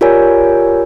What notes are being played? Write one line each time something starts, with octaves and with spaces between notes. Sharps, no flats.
F4 G4 A#4 C#5 D5 G#5